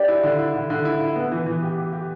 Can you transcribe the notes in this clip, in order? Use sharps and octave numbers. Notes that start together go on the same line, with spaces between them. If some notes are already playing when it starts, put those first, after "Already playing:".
Already playing: D4 G4 D5
E4
D3
E4
D3
D3
E4
E4
B3
E3
E3
G4
G4
G4